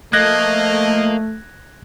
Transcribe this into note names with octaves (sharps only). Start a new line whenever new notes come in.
F3 A3 A#3 D#5 F#6 G#6 A#6